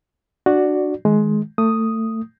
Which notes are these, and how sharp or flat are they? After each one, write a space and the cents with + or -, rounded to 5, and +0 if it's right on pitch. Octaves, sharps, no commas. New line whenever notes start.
D4 +20 F#4 +0 D5 +0
D#3 +15 G#3 +20
A3 +25 D#6 +0